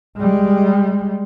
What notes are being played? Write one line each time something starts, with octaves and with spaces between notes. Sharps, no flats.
G3 G#3